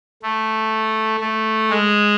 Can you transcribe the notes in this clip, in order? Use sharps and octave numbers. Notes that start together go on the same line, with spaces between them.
A3
A3
G#3